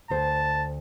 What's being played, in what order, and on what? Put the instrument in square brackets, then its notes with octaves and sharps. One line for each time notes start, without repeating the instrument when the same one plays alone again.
[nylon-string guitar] D2 C5 [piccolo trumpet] A5